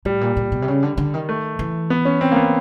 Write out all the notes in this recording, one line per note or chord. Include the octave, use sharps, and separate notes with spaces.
A2 G3
A#2
A#2
B2
C3
C#3
D3
D3
D#3
A3
E3
B3
C#4
C4
A#3
B3